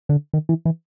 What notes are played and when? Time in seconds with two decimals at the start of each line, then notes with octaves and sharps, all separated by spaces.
0.09 D3
0.33 D#3
0.49 E3
0.65 E3